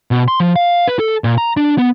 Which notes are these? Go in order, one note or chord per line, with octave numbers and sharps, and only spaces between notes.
B2
C6
F3
F5
B4
A4
A#2
A#5
D4
B3